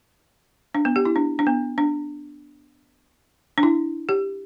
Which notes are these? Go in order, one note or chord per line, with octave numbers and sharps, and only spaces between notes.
D4
B3
G4
E4
D4
D4
B3
D4
D4
E4
G4